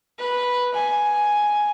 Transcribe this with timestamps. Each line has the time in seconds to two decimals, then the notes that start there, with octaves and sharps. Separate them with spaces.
0.19 B4
0.74 G#5